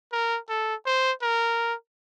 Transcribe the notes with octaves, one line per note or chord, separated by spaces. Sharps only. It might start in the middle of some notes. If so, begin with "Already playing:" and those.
A#4
A4
C5
A#4